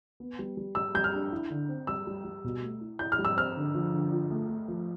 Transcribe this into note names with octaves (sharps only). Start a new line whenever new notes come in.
B3
G3
G3
G3 E6
G3 G6
F6
D4
E4
D3
C4
G3 E6
G3
G3
B2
A3
E4
E4 G6
F6
G3
E6
C4 F6
D3
F3
D3
F4
A3
A3
F3